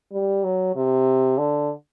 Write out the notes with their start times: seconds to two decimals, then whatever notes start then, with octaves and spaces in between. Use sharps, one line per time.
0.12 G3
0.44 F#3
0.76 C3
1.38 D3